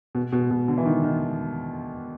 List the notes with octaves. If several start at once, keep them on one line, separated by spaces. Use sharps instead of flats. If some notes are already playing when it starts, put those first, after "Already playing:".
B2
B2
B2
D3
E3
D#3
D#3